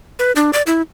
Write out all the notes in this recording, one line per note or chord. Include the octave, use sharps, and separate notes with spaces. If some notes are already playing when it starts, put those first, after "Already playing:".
B4
D4
D5
E4